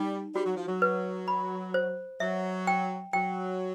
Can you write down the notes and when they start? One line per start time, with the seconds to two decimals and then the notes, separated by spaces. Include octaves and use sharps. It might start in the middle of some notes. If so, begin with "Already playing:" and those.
Already playing: G3 D#4
0.35 G3 F#4
0.46 F#3
0.57 F3
0.68 F#3
0.82 B4
1.28 B5
1.74 C5
2.20 F#3 E5
2.67 G5
3.13 F#3 G5